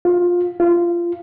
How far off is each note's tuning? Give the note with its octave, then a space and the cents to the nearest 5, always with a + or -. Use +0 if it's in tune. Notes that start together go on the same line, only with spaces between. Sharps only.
F4 +15
F4 -20